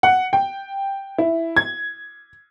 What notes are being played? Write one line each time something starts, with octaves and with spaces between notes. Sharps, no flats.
F#5
G5
E4
G#6